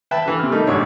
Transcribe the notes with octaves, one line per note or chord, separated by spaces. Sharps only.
B4 E5 G5 A5
D3 E3
C3 F6
G3 A3 D#4 A#4
B1 G#2 D4 C#5